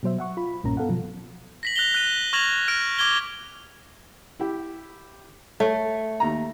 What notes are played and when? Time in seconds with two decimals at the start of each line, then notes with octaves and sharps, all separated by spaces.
0.03 B2 F#3 C5 E5
0.19 E5 F#5 C#6
0.37 F4 B5
0.64 B1 G2 A#2 A#3 C#4 A#5
0.77 B3 A4 F5 F#5
0.89 B2 F3 F#3
1.63 A#6 B6 F#7
1.76 F#6 A#6 F7 G7
1.94 F#6 D#7
2.33 C#6 F6 G#6 A#6 F7 F#7
2.68 F6 F#6 A#6 D7
2.98 D6 F6 G#6 G7
4.40 E4 G4
5.60 A3 C#5
6.20 D#2 A#5